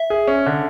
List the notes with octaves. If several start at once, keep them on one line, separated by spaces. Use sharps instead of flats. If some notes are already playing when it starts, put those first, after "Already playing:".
Already playing: E5
G#4
C#4
D3